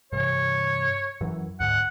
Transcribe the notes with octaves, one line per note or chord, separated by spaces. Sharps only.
G2 C3 E3 C#5
F#2 E3 F#3
D2 G#2 D3 F#5